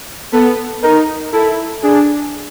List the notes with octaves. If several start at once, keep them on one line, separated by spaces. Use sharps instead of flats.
B3 A4
D#4 A#4
E4 A4
D4 G#4